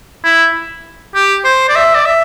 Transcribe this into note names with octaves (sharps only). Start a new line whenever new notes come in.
E4
G4
C5
D5
E5
D5
E5